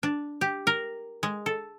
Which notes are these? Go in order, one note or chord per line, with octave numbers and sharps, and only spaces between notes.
D4
G4
A#4
G#3
A4